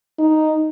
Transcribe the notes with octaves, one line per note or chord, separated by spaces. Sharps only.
D#4